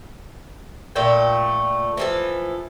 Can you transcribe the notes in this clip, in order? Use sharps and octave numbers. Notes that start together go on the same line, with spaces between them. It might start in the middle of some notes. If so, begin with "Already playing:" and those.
A#2 A3 G5
E3 F3 A4